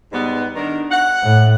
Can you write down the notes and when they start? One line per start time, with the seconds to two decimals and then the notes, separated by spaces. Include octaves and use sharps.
0.12 G#2 G3 B3
0.55 D#3 D4 A#4
0.91 F#5
1.23 A2